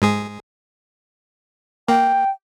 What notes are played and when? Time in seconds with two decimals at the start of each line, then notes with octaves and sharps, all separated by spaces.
0.02 G#2 G#3 G#4
1.88 A#3 G5